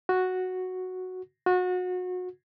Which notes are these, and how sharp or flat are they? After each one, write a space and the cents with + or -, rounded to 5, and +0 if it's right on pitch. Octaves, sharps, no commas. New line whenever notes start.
F#4 -5
F#4 -30